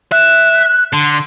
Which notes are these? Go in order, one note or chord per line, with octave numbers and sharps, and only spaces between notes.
E5 F#6
D3 C6